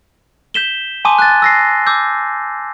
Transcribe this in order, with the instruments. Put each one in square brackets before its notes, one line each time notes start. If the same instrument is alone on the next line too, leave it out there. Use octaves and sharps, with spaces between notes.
[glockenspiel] G6 B6 E7 G7
G#5 A5 C6 D6 D#6 D#7
F#6 A6
E6 A#6 C7
D6 E6 G6